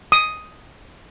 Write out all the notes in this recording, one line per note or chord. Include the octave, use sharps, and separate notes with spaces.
D#6